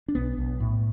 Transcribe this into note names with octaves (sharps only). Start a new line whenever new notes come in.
D4
B1 B3
B1
A2